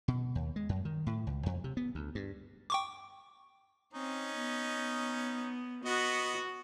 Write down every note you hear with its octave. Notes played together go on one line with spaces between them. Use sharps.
B2
D#2
G#3
F#2
D#3
A2
C#2
F2
C3
B3
D2
G2
G5 C#6 D6
C4 C#4 D#4
B3
B3 F#4 D#5 F#5